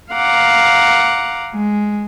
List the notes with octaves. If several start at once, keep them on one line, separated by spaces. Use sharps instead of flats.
F5 F#5 A#5 D6
G#3